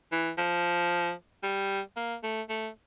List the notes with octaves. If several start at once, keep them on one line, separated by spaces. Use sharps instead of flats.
E3
F3
G3
A#3
A3
A3